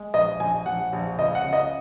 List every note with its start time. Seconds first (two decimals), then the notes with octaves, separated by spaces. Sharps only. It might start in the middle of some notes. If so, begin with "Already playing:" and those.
Already playing: G#3
0.14 A#1 D#5
0.40 A#1 G#5
0.66 A#1 F#5
0.93 A#1
1.18 C#2 D#5
1.35 F#5
1.44 C#3
1.53 D#5